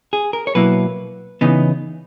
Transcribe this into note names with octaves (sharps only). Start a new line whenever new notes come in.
G#4
A#4
C#5
B2 F#3 A#3 E4 B4
C#3 E3 B3 D#4